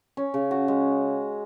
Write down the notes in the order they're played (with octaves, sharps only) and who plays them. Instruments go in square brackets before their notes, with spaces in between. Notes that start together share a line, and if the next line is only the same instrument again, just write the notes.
[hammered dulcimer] C#4
C#3
F#4
G#3